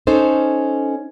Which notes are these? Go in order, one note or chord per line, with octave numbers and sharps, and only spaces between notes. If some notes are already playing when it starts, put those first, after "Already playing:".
C#4 D#4 A4 C5